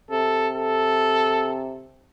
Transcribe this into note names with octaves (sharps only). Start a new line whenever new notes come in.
C3 A4
A4